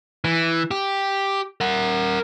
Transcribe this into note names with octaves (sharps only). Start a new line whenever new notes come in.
E3
G4
A#4 F#5